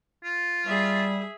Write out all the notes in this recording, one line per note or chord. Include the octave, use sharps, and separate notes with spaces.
F4
G3 G#4 E5